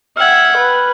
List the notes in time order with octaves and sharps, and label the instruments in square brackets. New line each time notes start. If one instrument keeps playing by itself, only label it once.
[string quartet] E5 F#5 G5 [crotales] F6 G#6
[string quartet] B4